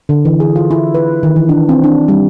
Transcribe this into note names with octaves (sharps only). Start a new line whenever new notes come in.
D3
E3
G#4
F4
E4
B4
D#3
E3
D4
C4
D4
G3